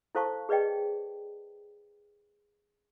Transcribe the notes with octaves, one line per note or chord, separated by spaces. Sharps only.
E4 A4 C5 F5 A5 C#6
G#4 B4 D5 D#5 G5